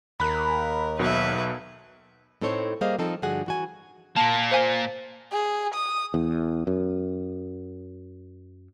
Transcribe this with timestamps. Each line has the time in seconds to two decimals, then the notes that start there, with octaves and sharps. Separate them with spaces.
0.20 D#2 A#4 B5 F#6
0.99 B1 B2 B4 E5
2.41 A2 C4 D#4 A4 C5 C#5
2.81 G3 A#3 G#4 C5 D#5 F5
2.99 F3 C4 D#4 A4
3.22 G2 D3 F3 F#4 G#4 F#5
3.46 E3 F#4 G#5
4.16 A#2 A#3 A5
4.51 C5 F5 G#5
5.32 G#4
5.75 D#6
6.14 E2
6.67 F#2